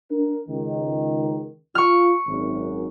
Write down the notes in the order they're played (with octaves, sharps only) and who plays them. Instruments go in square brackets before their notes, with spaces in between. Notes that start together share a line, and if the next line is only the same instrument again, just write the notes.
[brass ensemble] D4 A#4
C#2 D#3
[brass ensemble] F4 [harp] C#6 F6
[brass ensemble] G#1 F#2